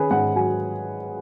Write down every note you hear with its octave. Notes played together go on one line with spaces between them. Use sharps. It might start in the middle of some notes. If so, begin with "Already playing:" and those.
Already playing: D#3 C#4 G#4 B4
G#2 F#5
F#3 G#5